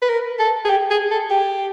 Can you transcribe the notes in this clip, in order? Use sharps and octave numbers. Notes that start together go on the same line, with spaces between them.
B4
A#4
A4
G#4
G4
G#4
A4
G4